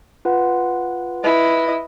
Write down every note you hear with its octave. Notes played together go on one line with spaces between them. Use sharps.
F4 B4 F#5
E4 B4 D#5